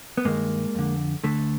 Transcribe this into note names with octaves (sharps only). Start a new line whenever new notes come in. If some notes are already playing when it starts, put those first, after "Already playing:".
B3
G2 D#3 G#3 A#3
F2 D3
D2 D3 A3